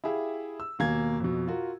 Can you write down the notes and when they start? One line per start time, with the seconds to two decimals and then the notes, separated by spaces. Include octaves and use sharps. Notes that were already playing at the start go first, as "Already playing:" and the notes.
0.04 E4 G4 G#4 E5 F5
0.60 E6
0.79 D#2 B2 A#3 G#5 G#6
1.20 F2 B2
1.48 F4 F#4 A#4